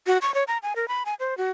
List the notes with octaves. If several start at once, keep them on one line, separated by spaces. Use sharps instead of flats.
F#4
C#6
C#5
A#5
G#5
A#4
B5
G#5
C5
F#4